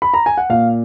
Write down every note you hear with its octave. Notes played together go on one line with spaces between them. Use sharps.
B5
A#5
G#5
F#5
A#2 F5